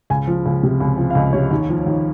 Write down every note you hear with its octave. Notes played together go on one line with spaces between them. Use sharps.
C#2 G#5
F3
C#2
C3
C#2
F3
F5
C#2 D#5
C3 C#5
D#2
F3
D#2